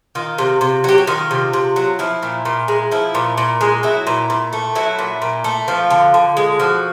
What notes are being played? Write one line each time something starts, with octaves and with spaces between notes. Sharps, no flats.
D#3 F4
C3
C3
F#3 G4
F#4
D#3 F4
C3
C3
F#3
F3 E4
A#2
A#2
G#3
F3 E4
A#2
A#2
G#3
F#3 E4
A#2
A#2
A3
F#3 E4
A#2
A#2
A3
F3 F4
D3
D3
G#3
F3 F#4